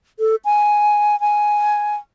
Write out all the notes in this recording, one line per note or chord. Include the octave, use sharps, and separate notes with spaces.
A4
G#5
G#5